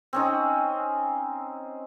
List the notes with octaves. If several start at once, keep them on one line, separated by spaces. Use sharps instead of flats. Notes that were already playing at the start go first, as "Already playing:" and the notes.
C4 C#4 D#4